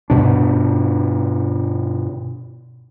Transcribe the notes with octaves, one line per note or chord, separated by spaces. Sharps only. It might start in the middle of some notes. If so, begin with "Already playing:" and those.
G2 B2 D4